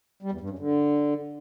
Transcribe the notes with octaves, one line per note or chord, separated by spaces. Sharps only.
G3
E2
G2
F#2
D3